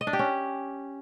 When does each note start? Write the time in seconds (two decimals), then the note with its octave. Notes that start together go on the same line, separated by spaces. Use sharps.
0.01 D#5
0.07 D4
0.13 G4
0.19 C#4